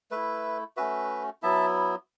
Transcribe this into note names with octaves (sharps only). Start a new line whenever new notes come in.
A3 E4 B4 E5
A3 C#4 F#4 B4 E5
F#3 B3 E4 E5 A5